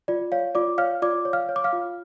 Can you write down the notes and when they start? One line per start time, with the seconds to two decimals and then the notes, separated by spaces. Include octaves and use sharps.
0.08 F4 D5
0.32 C#5 F5
0.55 F4 D5 D6
0.78 C#5 F5 F6
1.02 F4 D5 D6
1.25 C#5
1.33 F5 F6
1.49 C#5
1.56 D6
1.64 F5 F6
1.73 F4